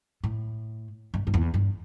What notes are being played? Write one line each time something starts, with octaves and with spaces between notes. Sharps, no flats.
A2
G2
G2
E2
G2